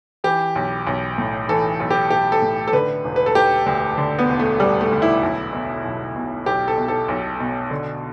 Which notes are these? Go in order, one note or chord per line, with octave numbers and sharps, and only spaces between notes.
E3 G4
B1
B1
A2
E3 A4
B1
G4
B1 G4
A4
A2
A4
D3 B4
E1
B4
A4
E1 G4
D2
D3
B3
E1
A3
E1 G3
A3
D2
E4
B1
B2
B1
B2
B1 G4
A4
B2
A4
B1
B2
D3